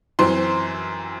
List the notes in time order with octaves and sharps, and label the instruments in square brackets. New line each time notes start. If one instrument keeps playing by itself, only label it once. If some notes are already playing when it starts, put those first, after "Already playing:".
[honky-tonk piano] F#2 E3 C4 C6